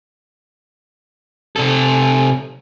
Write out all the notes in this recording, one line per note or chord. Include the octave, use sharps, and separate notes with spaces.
C3 A4